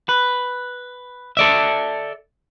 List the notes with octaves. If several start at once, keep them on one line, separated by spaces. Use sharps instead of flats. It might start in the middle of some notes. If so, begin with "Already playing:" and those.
B4
A4 D5 E5